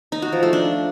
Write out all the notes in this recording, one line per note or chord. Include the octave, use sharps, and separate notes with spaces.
D#4
F#4
F3
A3
D4